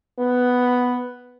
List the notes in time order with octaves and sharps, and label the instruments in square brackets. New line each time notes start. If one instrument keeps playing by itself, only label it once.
[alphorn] B3